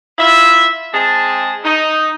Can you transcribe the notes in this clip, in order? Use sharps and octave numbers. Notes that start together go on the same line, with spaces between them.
E4 F4 E5
G#3 C4 G#4 A5
D#4